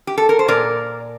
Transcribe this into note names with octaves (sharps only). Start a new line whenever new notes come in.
G4
A4
A#4
C5
A#2 A#4 D5